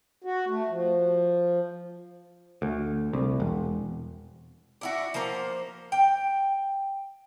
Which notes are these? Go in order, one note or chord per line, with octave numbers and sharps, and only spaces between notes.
F#4
A3
F3
D2
C2
E1
D4 E4 F#4
F3 A#3 C5 A#5
G5